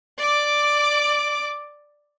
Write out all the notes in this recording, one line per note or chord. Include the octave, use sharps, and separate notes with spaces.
D5 D6